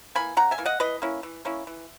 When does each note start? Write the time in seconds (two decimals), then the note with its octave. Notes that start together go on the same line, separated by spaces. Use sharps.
0.15 E3 A#3 G#5 B5
0.37 C#3 F#5 A#5
0.51 E5 G#5
0.58 E3 A#3
0.66 D#5 F#5
0.80 E3 B4 D#5
1.02 A#3 C#4 E4
1.23 E3
1.45 A#3 C#4 E4
1.67 E3